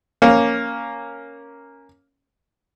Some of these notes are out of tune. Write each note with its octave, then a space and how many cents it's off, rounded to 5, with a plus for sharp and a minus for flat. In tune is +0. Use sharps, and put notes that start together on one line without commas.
A#3 +0 C#4 +0